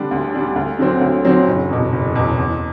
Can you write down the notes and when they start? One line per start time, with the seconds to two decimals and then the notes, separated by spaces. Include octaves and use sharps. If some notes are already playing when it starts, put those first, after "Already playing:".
Already playing: D3 G3 D4
0.11 D2
0.34 D3 G3 D4
0.56 D2
0.79 D3 F#3 C4
1.01 D2
1.25 D3 F#3 C4
1.48 F#1
1.69 E2 B2
1.93 F#1
2.15 E2 B2
2.38 E2